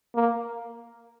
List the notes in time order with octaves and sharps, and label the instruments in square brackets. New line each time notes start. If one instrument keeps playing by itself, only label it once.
[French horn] A#3